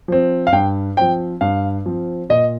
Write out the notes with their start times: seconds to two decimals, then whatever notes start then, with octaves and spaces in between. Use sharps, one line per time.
0.08 F3 C4
0.47 F5
0.52 G2 G5
0.97 F3 C4 G5
1.41 G2 F5
1.86 F3 C4
2.29 A#2 D#5